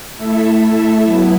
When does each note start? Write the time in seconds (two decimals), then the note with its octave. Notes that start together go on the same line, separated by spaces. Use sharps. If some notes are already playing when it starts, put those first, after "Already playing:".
0.17 A3 E4 A4 E5
0.61 A3 E4 A4 E5
1.04 F#3 B3 E4